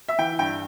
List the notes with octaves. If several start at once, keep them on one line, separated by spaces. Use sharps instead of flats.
E5
E3 G5
G2 G5